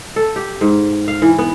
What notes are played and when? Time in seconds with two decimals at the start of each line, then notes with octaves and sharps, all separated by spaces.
0.16 A4
0.36 G4
0.61 G#2
1.08 F5
1.22 E3
1.39 B3